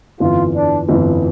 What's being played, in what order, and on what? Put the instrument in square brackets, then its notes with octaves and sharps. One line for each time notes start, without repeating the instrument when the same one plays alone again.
[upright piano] G1 F2 E3 [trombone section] F4
[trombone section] D4
[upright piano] G1 F2 E3